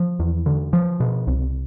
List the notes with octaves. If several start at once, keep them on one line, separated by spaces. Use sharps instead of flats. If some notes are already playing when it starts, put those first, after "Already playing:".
Already playing: F3
E2
D3
F3
B2
C2